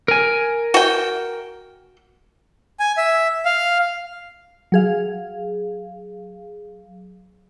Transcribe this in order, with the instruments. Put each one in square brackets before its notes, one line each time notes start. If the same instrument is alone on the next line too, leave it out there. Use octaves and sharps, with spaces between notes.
[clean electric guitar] A#4 G#5
[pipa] F#4 G5
[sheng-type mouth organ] G#5
E5
F5
[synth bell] F#3 G#4 F5